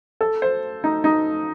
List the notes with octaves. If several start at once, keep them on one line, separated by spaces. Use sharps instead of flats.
A4
C5
D#4
D#4